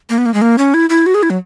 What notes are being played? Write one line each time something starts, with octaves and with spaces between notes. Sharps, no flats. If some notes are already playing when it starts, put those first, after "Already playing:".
A#3
B3
A#3
G#3
A#3
C#4
E4
E4
F#4
G#4
E4
F#3